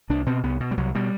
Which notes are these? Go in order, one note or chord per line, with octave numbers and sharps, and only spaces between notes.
C2 D4
B2 C4
C2 B3
B2
G3
C2 F#3
B2 G3